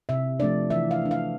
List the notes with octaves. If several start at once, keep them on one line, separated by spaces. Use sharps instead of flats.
C3 E5
F3 A3 D4 D5
E3 E5
F5
A3 D4
F5